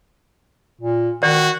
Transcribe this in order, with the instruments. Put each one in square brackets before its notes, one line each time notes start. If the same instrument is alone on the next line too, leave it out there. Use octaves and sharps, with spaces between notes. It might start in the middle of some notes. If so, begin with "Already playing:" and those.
[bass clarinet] A#2
[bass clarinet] D#3 [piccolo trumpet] F#4 [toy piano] D5